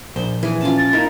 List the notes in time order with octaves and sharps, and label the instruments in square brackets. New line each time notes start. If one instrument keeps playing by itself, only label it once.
[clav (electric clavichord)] A#1 [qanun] C5
[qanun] E3 G#4
[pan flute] C#4 [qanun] F4 A5
[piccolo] A6
[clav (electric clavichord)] A#3 D#4 E4 [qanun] A#4